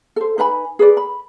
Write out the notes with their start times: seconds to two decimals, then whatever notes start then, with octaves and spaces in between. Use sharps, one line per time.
0.16 A4 C5
0.38 D#4 B4 G#5 B5
0.79 G#4 B4 D5
0.97 B5